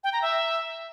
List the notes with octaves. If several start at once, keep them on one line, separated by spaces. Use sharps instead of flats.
G5
A#5
E5